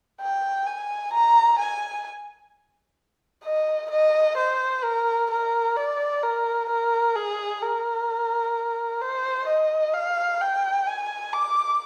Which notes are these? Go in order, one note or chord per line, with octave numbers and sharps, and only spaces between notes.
G5
G#5
A#5
G#5
D#5
D#5
C5
A#4
A#4
D5
A#4
A#4
G#4
A#4
C5
D#5
F5
G5
G#5
D6